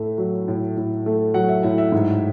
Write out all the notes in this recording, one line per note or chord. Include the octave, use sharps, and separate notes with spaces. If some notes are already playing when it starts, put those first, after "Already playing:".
Already playing: A2 A3 E5
F#3
A2
A2
A3
F#3 F#5
E5
A2 E5
E5
G#2